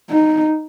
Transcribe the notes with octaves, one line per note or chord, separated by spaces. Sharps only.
D#4